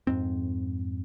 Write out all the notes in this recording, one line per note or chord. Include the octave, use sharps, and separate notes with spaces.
F2 G#2 C4